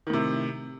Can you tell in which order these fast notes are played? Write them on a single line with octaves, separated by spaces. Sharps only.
D#3 A2 C3